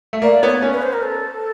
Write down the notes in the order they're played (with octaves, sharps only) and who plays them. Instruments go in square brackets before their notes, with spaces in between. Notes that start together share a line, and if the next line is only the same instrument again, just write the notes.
[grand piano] A3
[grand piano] A#3 [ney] D5
[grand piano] B3 [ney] C#5
[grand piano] C#4
[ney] B4
C5
A#4
A4